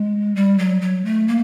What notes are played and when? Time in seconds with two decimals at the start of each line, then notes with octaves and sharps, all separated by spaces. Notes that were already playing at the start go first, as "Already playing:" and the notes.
Already playing: G#3
0.36 G3
0.59 F#3
0.82 F#3
1.05 A3
1.28 A#3